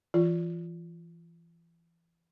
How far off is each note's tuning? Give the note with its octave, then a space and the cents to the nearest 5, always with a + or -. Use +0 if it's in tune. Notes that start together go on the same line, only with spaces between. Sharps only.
E3 +25 F4 +0